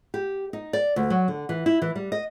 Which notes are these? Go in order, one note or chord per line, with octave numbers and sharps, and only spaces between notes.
G4
D#4
D5
D2
F#3
D3
E3
E4
E3
G3
D#5